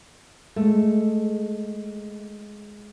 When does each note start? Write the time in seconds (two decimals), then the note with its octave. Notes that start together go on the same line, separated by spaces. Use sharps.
0.56 G#3 A3